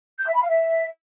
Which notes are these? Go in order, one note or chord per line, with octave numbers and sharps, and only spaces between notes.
G6
E5
B5
F5
E5